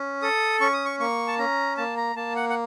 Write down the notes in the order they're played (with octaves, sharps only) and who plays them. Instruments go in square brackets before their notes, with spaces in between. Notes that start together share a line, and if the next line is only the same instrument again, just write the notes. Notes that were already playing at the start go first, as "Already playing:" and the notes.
Already playing: [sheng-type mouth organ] C#4
A4 D#6
C#4 C#6
D#6
C#6
A#3 C#6
A5
C#4 A#5
A#3 A5
A#5
A#3 A5
F#5
F#5